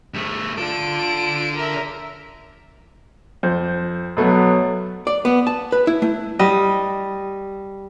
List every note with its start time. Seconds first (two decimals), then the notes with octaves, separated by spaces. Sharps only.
0.14 G2 A3
0.58 D4 F4 A4 D7
1.56 A#4 E5
3.43 F2 C5
4.17 B2 F#3 A3 B3
5.07 D5
5.25 B3
5.47 A5
5.72 B4
5.87 E4
6.02 A3
6.39 G3 D#5